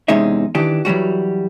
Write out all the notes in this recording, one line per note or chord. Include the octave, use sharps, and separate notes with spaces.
E2 C3 G#3 C#4 D#4 E5
D#3 E3 D4 G4 G5
E3 F#3 G3 F#4